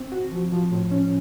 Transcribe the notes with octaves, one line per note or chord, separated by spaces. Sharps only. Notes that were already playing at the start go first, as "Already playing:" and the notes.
Already playing: C4
F#4
F3
F3
A2
C#4